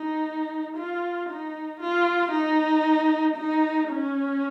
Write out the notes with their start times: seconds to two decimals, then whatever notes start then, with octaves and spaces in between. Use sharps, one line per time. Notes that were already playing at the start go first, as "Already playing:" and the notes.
Already playing: D#4
0.76 F4
1.29 D#4
1.80 F4
2.32 D#4
3.36 D#4
3.89 C#4